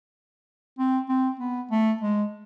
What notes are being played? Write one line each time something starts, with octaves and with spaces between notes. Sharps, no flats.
C4
C4
B3
A3
G#3